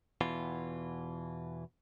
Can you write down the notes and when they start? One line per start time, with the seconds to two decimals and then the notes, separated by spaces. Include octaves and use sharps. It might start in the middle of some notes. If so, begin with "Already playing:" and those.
0.21 E2 B2 E3 F4